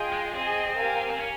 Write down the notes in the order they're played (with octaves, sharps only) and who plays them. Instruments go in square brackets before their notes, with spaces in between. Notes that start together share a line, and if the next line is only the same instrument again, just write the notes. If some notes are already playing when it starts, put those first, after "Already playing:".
Already playing: [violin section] F4 G#4 D#5 G5
[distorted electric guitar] G#3
[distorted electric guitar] C4 [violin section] G#4 D#5 G#5
[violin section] G4 A#4 F5 G#5
[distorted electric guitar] C4
C#4